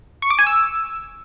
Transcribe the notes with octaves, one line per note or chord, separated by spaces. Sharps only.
C#6
D6
G#5
E6